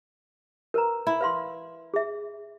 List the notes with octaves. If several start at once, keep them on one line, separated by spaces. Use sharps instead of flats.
A#4 B4 A#5
E4
B4 F5 C6
G#4 E5